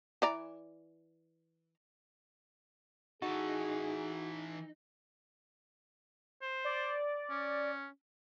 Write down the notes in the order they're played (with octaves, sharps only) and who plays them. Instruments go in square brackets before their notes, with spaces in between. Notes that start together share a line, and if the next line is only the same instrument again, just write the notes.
[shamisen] E3 D5 A#5
[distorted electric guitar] E3 A4 [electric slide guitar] D#4 [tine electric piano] F#4 [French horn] G#4
[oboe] C5
[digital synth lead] D5
[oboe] C#4